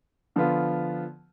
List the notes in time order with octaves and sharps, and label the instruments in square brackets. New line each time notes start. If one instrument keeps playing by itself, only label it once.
[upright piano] D3 F3 B3 F4